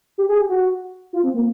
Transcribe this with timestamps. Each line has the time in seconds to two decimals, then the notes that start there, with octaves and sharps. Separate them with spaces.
0.18 G4
0.29 G#4
0.39 G4
0.49 F#4
1.13 F4
1.24 C4
1.34 A#3